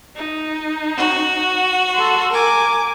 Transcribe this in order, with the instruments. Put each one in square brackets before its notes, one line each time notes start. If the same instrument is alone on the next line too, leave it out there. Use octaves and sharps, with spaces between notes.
[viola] D#4
[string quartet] F#4
[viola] A4 C6
[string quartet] A#4 [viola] G#5 D6